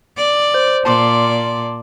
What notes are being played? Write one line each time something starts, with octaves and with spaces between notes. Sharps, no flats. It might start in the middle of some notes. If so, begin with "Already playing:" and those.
D5
C5
A#2 D5 A5 C6 D6